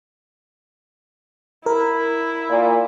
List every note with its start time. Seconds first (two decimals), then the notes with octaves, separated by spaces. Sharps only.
1.66 E4 A#4
2.49 A#2